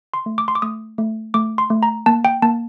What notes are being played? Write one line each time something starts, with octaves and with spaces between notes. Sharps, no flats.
C6
A3
D6
C6
D6
A3 D#6
A3
A3 D6
C6
A3
A#5
A#3 A5
G5
A#3 A5